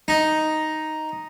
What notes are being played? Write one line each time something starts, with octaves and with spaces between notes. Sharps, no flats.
D#4